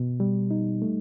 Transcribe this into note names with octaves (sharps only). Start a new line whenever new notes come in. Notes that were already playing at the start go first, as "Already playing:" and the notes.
Already playing: B2
G3
D#4
A3